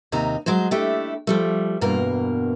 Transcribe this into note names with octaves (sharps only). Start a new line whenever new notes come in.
D#2 C3 D#4 A#5
F#3 G#3 G#4 C5
A3 D4 E4 G4
F3 G3 A3
E2 G2 B2 A#3 A#4